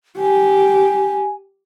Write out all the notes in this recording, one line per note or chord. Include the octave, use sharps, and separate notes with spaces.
G4 G#5